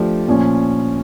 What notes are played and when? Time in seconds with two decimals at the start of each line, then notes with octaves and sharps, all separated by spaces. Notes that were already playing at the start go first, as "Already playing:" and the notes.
Already playing: F3 A3 D4 G4
0.28 A#2 F3 C#4